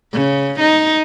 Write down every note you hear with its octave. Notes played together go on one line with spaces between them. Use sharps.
C#3
D#4